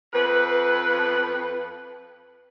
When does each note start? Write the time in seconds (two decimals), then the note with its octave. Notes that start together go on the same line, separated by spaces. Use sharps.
0.14 F2 B4